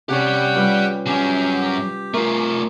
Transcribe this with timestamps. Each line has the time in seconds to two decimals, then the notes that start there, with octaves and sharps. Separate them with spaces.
0.09 C3 C#4 G4 D5 F#5 G5
0.55 G3 F4 B4
1.07 F#3 C#4 G4
2.14 A3 F4 A#4